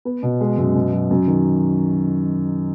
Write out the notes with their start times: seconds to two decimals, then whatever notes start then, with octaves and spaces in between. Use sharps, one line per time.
0.05 B3
0.23 B2
0.41 G#3
0.58 F#2
0.75 B2
0.93 F#3
1.11 F#2
1.27 D#3